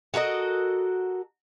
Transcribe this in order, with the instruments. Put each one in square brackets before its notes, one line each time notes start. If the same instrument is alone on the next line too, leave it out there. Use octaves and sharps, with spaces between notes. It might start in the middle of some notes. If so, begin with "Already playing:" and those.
[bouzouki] F#4 A4 A#4 D#5